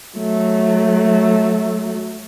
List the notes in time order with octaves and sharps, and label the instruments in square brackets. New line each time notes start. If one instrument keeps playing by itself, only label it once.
[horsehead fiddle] F#3 A3